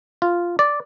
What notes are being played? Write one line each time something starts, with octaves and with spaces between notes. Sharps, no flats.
F4
D5